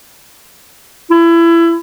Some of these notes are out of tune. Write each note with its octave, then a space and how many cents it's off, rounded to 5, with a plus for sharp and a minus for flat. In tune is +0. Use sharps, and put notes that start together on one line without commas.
E4 +25